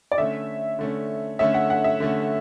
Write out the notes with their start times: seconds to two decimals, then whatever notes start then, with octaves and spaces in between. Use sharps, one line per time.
0.12 D5
0.18 D3 A3 C#4 E5
0.79 D3 A3 C#4
1.39 D3 A3 C#4 E5
1.54 F#5
1.70 F#5
1.84 E5
2.00 D3 A3 C#4